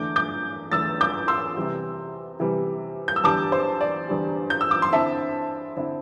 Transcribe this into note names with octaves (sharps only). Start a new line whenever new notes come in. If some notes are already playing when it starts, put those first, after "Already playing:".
Already playing: E2 D3 A3 D6 G6
D6 G6
E2 D3 A3 E6 A6
D6 G6
C6 E6
C3 E3 G3
C3 E3 G3
G6
E6
E2 D3 G3 A5 D6
C5
D5
E2 D3 G3
G6
E6
D6
C6
D3 C4 E4 E5 A5
D3 C4 E4